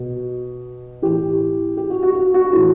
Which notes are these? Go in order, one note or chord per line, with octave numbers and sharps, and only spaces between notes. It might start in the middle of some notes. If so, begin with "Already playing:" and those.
Already playing: B2
A2 E3 G4
G4
F#4
F#4
F#4
F#4
A2 E3